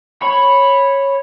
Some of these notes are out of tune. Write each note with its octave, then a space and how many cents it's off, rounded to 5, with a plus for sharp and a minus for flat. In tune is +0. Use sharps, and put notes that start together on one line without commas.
C#5 -10 B5 +0